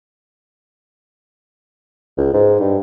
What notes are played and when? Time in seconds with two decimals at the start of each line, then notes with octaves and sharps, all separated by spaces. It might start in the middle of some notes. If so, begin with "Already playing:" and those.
2.18 C#2
2.33 G#2
2.60 G2